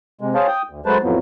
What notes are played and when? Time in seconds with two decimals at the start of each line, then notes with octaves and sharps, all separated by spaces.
0.21 C3 G#3
0.35 G#4 C5 C#5 F5 A5
0.48 G5 D#6
0.70 D2
0.86 F#3 G#3 A3 B4 C5 A5
1.03 F2 A2 F3 F#3 B3